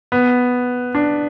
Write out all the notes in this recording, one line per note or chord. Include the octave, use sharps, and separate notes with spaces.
B3
D4